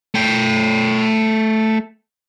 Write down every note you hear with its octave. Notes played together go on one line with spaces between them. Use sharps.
A3 G5